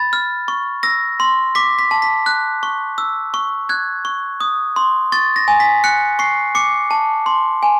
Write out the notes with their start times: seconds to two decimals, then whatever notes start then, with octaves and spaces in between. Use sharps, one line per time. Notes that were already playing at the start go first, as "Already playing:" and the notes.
Already playing: B5 A6
0.13 F6
0.48 C#6
0.83 E6 A#6
1.20 C6
1.55 D6 B6
1.79 B6
1.91 A5
2.02 B6
2.26 F#6
2.63 C#6
2.98 E6
3.34 C#6
3.69 F#6 G#6
4.05 C#6
4.40 D#6
4.76 C6
5.12 C#6 A6
5.36 A#6
5.48 G#5
5.60 B6
5.84 F#6 C#7
6.19 C#6 C7
6.55 D6 C#7
6.91 A5
7.26 C6
7.63 G#5